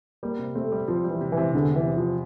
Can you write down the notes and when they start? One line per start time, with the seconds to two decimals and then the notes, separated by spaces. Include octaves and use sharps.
0.23 G3 A#3
0.39 C3
0.55 A3 C4
0.72 G3
0.88 F3 C4
1.04 G3
1.10 E3
1.21 C3
1.32 E3
1.37 C3
1.53 E2 D3
1.70 C3
1.76 E3
1.86 C3
1.97 F3